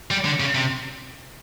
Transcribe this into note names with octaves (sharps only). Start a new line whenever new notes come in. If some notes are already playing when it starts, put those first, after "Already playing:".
G3
D3
C#3
C3